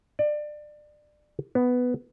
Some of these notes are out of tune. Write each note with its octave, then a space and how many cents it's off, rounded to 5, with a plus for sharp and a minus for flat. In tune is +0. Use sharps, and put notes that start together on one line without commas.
D5 +25
B3 +5